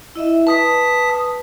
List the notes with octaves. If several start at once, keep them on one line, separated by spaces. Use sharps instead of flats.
E4 D#5 E5
B4 A5 D#6 B6